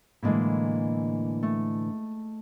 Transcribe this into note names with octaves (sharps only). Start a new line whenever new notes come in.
A2 D3 E3 G#3 A#3 E4
A3